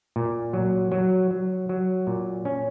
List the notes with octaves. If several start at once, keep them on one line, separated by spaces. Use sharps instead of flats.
A#2
F#3
F#3
F#3
F#3
A#2
C#4